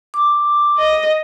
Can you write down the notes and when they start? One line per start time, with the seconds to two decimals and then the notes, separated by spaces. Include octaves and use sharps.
0.14 D6
0.78 D#5